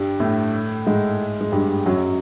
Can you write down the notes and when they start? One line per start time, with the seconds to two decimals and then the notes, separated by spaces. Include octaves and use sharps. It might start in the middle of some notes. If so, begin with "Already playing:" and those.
Already playing: G2 G3
0.20 A2 A3
0.87 G#2 G#3
1.41 G#3
1.52 G2 G3
1.86 F#2 F#3